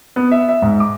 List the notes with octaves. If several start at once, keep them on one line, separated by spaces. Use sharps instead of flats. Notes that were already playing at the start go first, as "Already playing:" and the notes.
B3
E5
E5
G#2
D6